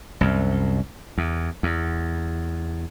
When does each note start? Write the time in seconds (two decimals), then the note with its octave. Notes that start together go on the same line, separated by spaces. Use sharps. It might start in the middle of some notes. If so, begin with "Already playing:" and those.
0.21 C2 F#2
1.18 E2
1.63 E2